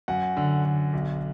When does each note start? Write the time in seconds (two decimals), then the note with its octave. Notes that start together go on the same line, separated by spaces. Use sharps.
0.08 F#2 F#5
0.37 D3
0.65 D3
0.93 B1